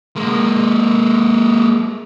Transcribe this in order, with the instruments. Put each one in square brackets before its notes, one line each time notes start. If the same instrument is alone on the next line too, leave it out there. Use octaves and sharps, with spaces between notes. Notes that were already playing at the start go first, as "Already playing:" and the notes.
[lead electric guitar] G#3 A#3